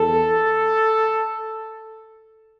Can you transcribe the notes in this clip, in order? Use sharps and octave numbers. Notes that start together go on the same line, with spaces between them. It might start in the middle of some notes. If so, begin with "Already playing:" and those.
Already playing: E2 A4